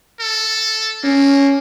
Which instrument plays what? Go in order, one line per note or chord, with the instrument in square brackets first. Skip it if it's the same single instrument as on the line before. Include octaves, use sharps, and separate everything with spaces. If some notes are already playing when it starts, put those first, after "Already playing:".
[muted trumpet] A4
[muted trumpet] A#3 [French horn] C#4